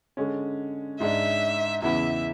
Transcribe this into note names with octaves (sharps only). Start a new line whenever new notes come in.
D3 G#3 C#4
G#2 G#3 D4 E5
E2 C#3 E3 B3 E4 E5